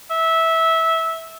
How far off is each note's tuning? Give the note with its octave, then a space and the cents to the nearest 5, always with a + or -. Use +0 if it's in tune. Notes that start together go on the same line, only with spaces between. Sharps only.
E5 -15